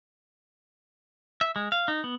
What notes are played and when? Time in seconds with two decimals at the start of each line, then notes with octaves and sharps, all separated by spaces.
1.41 E5
1.56 G#3
1.72 F5
1.88 D#4
2.04 B3